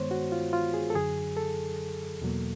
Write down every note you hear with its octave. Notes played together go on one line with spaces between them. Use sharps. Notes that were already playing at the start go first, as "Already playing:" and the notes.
Already playing: G2 D#3 G#3 B3 C5 C#5
F#4
F4
F4
G#4
A4
F#2 D3 F#3 G#4
A4
E2 B2 F#3 A#3